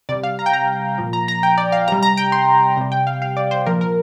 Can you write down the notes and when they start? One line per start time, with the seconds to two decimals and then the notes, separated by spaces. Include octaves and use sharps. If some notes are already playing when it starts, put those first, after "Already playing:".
0.09 C3 G3 D5
0.23 F5
0.39 A#5
0.46 G5
0.53 A#5
0.98 A#2 F3
1.13 A#5
1.28 A#5
1.43 G5
1.58 D5
1.72 F5
1.88 C3 A#5
1.92 G3
2.03 A#5
2.17 G5
2.32 C6
2.77 C3 G3
2.92 G5
3.07 F5
3.22 F5
3.37 D5
3.51 C5
3.66 A#2 F3 A#4
3.81 A#4